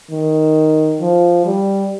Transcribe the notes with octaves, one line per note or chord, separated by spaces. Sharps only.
D#3
F3
G3